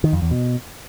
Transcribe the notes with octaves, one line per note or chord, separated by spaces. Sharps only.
D#3
F2
E2
B2